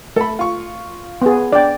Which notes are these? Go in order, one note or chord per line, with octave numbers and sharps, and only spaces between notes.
A3 A4 B5
F4 C#6
B3 G#4
D4 D5 G5